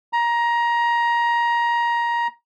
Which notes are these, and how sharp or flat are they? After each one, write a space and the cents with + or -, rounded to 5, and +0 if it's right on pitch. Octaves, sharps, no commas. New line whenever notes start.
A#5 +20